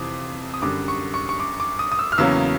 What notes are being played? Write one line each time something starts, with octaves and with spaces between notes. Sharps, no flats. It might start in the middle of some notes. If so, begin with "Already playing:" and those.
Already playing: F2 C3 E3 D6 D#6
D#6
F#2 D3 G3 D6
C#6
C#6
C#6
D6
D6
D#6
D#6
E6
F6
E2 C#3 F#3 A#3 C#4 E6